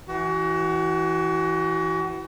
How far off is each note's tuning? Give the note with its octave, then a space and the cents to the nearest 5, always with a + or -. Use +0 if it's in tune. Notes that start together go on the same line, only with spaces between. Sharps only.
E3 +0 F#4 +35